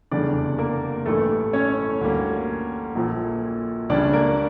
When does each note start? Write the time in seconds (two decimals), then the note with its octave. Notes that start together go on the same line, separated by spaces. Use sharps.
0.11 F1 E2 C#3 G3 D4 D5
0.58 A#3 A#4
1.05 A1 G2 E3 A3 A4
1.53 C#4 C#5
2.01 D2 D3 G3 A#3
2.95 A#1 A#2 F3
3.89 C#2 C#3 G3 C#4 D4 D5
4.13 A#3 A#4